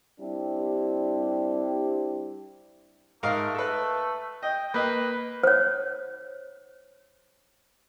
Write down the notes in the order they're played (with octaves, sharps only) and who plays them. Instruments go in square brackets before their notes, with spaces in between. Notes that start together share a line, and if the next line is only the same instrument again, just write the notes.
[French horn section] G3 C4 D4 E4 G4
[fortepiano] G#2 A#4 F5 [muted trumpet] A3
[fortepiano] A4 B4
[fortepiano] D#5 [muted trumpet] G5
[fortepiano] A#3 D#5 [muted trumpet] B4
[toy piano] C5 C#5